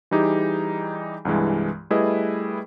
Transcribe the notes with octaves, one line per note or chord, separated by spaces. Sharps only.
E3 G3 D#4 G4 G#4
C2 G2 E3 G#3
G3 A3 E4 G#4 B4 D#5